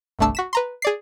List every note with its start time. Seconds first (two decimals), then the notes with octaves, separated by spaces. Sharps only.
0.19 G1 C2 A3 D4 A5 E6
0.35 F#4 B6 E7
0.53 B4 A#5 C6
0.82 G#4 D5 C7